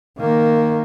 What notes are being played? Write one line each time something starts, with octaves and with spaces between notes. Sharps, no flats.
D#3 A#3